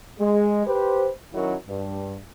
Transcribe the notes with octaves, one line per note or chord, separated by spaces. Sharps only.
G#3
G4 B4 C5
D#3 F#3 C#4 E4 F#4 A#4
G2